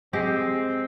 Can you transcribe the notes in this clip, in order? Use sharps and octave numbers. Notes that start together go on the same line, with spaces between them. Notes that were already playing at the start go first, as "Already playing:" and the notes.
G#3 C4 G4